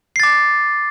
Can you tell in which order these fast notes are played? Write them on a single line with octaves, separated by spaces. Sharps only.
C7 A6 D6